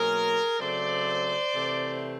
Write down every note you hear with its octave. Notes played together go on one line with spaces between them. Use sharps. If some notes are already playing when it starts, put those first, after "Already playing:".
Already playing: B2 F#3 A#3 C#4 G#4 A#4
C#3 F#3 A3 C4 C5 D5
C3 E3 A3 C4